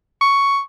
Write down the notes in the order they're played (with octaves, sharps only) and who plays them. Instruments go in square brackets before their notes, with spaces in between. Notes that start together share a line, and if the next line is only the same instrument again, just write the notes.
[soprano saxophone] C#6